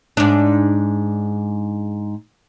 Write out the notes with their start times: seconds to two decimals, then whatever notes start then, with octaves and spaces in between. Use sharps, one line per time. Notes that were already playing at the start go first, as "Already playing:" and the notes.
0.17 G#2 D4